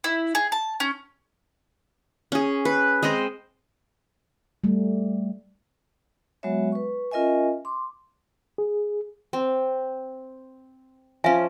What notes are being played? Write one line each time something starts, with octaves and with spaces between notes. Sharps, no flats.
E4
G#4
A5
C#4
C#4 G#4
B4
G#3 C4 C5 D#5
G3 A3
F#3 G#3 B3 F#4 C#5 E5
B4 C#6
C#4 F4 A#4 D#5 E5 G#5
C6 D6
G#4
C4
F3 C#4 E5 F5 G#5